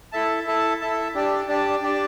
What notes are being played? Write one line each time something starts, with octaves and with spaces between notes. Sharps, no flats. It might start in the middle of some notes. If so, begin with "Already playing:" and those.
E4 A4 E5 A5
E4 A4 E5 A5
E4 A4 E5 A5
D4 G4 D5 A5
D4 G4 D5 A5
D4 G4 D5 A5